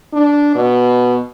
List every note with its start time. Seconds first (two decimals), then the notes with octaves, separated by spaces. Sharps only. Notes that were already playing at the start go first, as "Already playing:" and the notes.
0.13 D4
0.55 B2